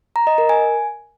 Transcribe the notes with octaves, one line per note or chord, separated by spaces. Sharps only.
A#5
D#5
A#4
G#5